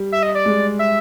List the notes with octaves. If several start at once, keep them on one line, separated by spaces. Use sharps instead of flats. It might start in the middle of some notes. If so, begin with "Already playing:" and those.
Already playing: G3
E5
D#5
D5
G#3
E5